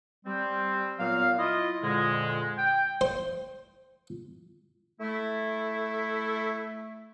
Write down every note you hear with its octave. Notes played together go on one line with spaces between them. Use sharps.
G3 C4
A#2 F#3 B3 F5
E4 F4 D#5
F2 A#2 D3 G#3
G5
C5
A3 E4